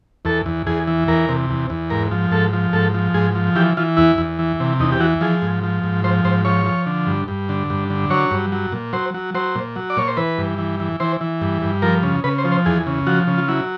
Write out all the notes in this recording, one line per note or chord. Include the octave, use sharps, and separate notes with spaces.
E2 A4
E2
E2 G#4
E3
E2 A#4
C3
E2
E2
G#2 A#4
F3
G#2 A4
F3
G#2 A4
F3
G#2 G#4
F3
E3 G4
E3 F4
E2 E4
E2
E3
C3
E2 D#4
G4
E3 F#4
F3 G#4
G#2
F3
G#2
F3 C5
G#2 C5
F3 C#5
F3
D3
G2
G2
D3
G2
D3
F#3 C#5
G2
F#3
A#2
F#3 C5
F#3
F#3 C5
A#2
F#3
D5
A#2 C#5
C5
E3 B4
G2
E3
E3
E3 C5
E3
G2
G2
F3 A#4
C#3
C#3 B4
C5
F3
C5
E2 G#4
C#3
F3 F#4
C#3
F4
F#3 E4